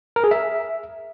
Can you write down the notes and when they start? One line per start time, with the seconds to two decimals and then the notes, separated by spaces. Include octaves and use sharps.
0.16 A#4
0.24 G#4
0.31 E5